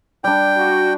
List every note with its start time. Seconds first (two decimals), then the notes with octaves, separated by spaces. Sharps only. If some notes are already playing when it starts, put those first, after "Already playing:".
0.24 G3 D4 G5
0.58 F#4